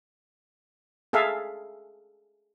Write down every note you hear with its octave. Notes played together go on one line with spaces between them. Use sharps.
G#4 A4 E5 F5